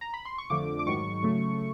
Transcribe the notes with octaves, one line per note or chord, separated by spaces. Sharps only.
A#5
B5
C6
C#6
F2 D3 F3 A3 D6
D6
G#2 D#3 F#3 C#6
C#3 F#3 A3